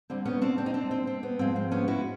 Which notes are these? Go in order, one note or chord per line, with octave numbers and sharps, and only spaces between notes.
D2 D3 G3 C4
B3 C#4
C4 D4
C4 D4
D#4
C4 D4
C4
C4
B3
G#2 F3 G#3 C4
C4
B3 C#4
E4 F#4